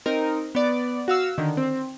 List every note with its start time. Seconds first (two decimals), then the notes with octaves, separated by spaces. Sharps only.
0.06 C4 D#4 A#4
0.55 B3 D5
1.08 F#4 F5 E6
1.38 D3 D#3
1.57 C4